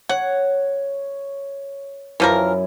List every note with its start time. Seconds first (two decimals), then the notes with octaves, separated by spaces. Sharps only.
0.09 C#5 F#5
2.20 F#2 E3 F3 E4 A#4